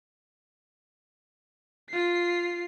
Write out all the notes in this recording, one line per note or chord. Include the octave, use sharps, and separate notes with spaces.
F4 C7